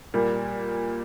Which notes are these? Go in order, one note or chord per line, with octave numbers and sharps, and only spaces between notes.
A#2 G3 A#3